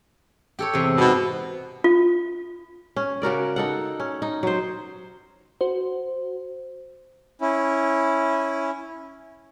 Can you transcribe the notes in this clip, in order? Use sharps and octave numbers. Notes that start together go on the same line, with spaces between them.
G4 A4 C#5
E2 C3
G#2 B2
F4
C#4
C#3 F#4 A#4 D5
D#4 A4 F#5
C#4
D#4
F#3 C5
F#4 C5
C#4 E4